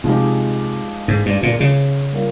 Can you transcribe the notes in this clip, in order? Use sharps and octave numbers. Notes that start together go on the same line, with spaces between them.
C3 F3 G#3 D#4 G4
G#2
G2
A#2
C#3
G3 A#3 F4